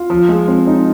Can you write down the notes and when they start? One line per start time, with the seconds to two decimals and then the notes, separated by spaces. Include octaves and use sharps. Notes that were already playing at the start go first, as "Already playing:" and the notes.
Already playing: F4
0.10 F3
0.29 G#3
0.48 C4
0.67 D#4